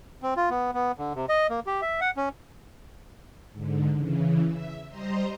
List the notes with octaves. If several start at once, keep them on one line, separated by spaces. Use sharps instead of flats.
C4
F4
B3
B3
D3
C3
D#5
A#3
G4
E5
F#5
C#4
G#2 D3
C#3 E3
E5
G3 C5 D#5 A#5 C6